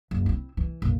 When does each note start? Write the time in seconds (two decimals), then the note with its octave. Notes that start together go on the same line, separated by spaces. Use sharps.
0.11 F#1
0.26 C4 E4
0.57 E3
0.82 A#1 F2